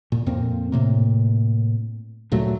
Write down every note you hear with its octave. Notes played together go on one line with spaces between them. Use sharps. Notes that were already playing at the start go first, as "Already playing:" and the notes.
A#2
F2 A#2 A#3 C4
A2 C3 A#3
D2 A#2 F#3 A3